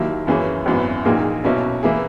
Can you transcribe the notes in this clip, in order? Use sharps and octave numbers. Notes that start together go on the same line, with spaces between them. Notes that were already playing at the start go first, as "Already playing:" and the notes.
Already playing: D#2 D#3 F#3 A#3 E4
F#2 E3 A#3 C#4 G#4
G#1 F#2 E3 B3
A#1 A#2 A#3 D#4 G#4
B1 B2 A#3 C#4 E4
E3 A#3 E4 G#4